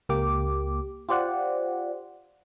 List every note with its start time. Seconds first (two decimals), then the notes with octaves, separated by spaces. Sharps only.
0.09 C#2 A#3 G4 D6
1.09 F4 G4 C5 D5 F#5